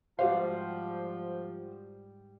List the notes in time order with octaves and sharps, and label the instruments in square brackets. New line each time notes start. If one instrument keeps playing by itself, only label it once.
[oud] G#2 G3 F5 [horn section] F3 [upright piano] F#4 G4 C5